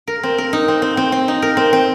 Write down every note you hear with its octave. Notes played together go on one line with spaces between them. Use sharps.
A#4
C4
A#4
D#4
C4
C4
C4
C4
D#4
A#4
C4
C4